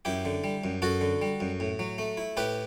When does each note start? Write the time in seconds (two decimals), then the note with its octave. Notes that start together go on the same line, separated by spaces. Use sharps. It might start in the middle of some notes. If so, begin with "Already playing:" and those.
0.05 F#2 E4 G4
0.25 D3
0.44 G3
0.64 F#2
0.82 F#2 F#4 A4
1.01 D3
1.22 G3
1.40 F#2
1.60 A2
1.79 F#3
1.98 A3
2.18 E4
2.37 A2 G4 B4